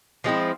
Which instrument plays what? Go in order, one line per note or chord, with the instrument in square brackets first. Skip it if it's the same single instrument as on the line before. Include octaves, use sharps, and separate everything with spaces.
[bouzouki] F3 G#3 C4 E4